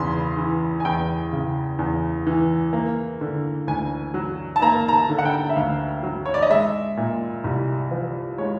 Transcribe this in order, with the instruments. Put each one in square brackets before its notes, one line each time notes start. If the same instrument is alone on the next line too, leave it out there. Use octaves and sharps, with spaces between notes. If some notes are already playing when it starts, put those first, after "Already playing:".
Already playing: [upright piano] E2 C#3 B5 C6
E3
G#5
E2 G5
C#3
E2
E3
A#3
D3
D2 G#5
F#3
A5
A#3 A#5
A#5
A5
D3
F#5
G5
E5
D2 F5
F#3
C#5
D5
D#5
G#3 E5
A#2
C2
F3
G#3 C#5